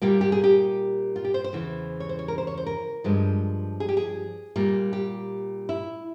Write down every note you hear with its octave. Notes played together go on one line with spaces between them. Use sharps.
A#2 G3 A#3 G4
G4
G#4
G4
F4
G4
C5
C5
E2 C#3 E3
C#5
C5
C#5
A#4
C5
C#5
C5
A#4
G2 F3 G#3
G#4
G4
G#4
A#2 G3 A#3
G4
E4